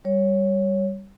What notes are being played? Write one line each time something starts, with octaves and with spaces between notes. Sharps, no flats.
G3 C#5